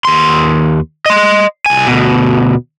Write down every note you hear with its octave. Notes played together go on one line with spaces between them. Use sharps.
D#2 C6
D#5 C6
C2 G#5
D2 B2